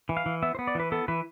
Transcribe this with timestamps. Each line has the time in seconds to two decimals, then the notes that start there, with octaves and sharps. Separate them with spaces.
0.09 E3
0.17 F5
0.26 E3
0.42 B3 E5
0.55 C5
0.59 B3
0.67 D5
0.75 E3 B4
0.92 B3 A4
1.08 E3 B4